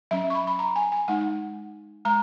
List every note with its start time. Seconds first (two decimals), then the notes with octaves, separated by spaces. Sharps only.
0.11 F#3 C#4 E5
0.30 C#6
0.35 B5
0.47 B5
0.59 A#5
0.76 G#5
0.92 G#5
1.08 G#3 D#4 F#5
2.05 G#3 A#5